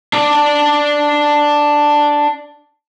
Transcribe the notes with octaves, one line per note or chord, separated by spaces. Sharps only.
D4 D5